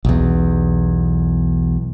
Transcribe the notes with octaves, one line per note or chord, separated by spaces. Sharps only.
B1 E2